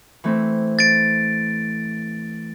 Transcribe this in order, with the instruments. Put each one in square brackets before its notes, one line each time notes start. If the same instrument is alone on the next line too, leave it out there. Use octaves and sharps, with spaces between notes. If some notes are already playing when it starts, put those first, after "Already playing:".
[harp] E3 A3 C4
[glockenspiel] A6 D7